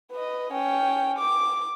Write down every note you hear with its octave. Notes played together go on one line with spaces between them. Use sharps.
B4 D#5
C#4 G5
D6